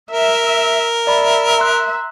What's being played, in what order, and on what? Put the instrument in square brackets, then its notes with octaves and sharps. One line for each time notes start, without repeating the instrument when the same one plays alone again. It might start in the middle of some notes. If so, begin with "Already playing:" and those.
[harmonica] A#4 [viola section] E5
[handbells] D5 B5 [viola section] E5
[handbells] A#5 C6 F#6